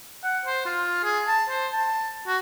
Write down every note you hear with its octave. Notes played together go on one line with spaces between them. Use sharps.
F#5
C5
F4
G#4
A5
C5
A5
F#4